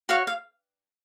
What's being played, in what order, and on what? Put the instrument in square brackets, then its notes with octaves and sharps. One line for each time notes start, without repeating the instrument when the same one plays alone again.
[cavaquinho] F#4 C#5 F5
F5